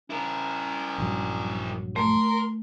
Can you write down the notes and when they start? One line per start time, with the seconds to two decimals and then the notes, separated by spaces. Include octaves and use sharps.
0.10 C#4 E4 A#4
0.98 A#1 G2 F#3
1.96 A3 A#4 C6